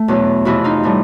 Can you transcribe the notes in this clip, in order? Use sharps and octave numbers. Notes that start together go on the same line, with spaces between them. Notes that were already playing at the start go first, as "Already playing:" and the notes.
Already playing: A3
E2 B2 F#3
F2 C3 E3 E4 F#4
D#4 F4
A2 E3 G3